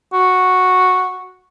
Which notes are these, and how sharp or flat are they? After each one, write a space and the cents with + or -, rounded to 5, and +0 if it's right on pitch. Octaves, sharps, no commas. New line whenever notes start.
F#4 -5